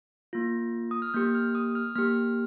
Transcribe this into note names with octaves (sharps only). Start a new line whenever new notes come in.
A#3 F4
D#6
F6
A#3 G4 G6
F6
D#6
F6
A#3 G4 F6